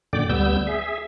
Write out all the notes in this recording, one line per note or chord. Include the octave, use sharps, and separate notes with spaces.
F#2 A#2 D3 D5 G5 D6
D2 G3 B3 E6 G6
G#4 E5